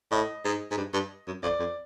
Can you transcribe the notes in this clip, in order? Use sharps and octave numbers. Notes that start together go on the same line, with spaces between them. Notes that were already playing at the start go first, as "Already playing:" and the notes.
A2 D#5
G#2
G#2
G2
G2
F#2
F2 D5
F2